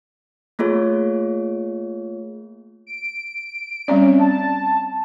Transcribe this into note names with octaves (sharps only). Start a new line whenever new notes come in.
A3 A#3 F4 G#4 C#5
D7
G3 C4 C#4 D5
A5